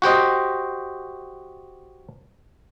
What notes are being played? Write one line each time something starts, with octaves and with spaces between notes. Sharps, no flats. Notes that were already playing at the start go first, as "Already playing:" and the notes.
F#4 G4 C5 D#5